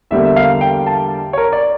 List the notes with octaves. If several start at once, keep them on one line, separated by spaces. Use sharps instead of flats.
E2 D3 G3 A#3 E5
E5
F5
G5
A5
C#5
A#4
D5